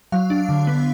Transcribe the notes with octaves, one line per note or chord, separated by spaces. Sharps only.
F#3 F5
D4
D3
B3